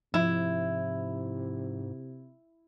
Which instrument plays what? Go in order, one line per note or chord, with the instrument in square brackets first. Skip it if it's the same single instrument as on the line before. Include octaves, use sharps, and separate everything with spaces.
[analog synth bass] G#2 [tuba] C3 [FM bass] F3 [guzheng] E4